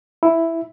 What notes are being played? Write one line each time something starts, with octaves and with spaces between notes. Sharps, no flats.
E4